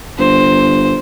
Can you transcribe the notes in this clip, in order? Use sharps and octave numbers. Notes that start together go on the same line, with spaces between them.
G1 C5